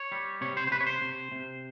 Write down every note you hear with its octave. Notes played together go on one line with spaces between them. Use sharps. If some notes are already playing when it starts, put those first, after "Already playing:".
Already playing: C#5
G3
C3 C#5
C5
C5
C3 B4
C#5
C5
C3
C3